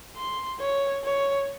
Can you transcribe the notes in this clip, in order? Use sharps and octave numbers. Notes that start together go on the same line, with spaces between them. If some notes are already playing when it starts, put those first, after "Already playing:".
C6
C#5
C#5